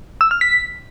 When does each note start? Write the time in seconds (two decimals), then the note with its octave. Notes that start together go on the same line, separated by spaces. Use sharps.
0.21 E6
0.31 F6
0.41 B6